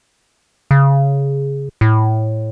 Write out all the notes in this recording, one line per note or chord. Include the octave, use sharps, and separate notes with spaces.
C#3
A2